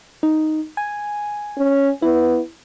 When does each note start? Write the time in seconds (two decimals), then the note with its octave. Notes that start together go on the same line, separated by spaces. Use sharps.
0.23 D#4
0.77 G#5
1.57 C#4
2.02 B3 E4